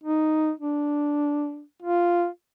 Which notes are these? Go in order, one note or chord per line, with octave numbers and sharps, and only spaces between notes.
D#4
D4
F4